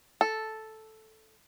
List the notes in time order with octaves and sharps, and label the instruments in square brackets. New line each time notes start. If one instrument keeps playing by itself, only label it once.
[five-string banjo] A4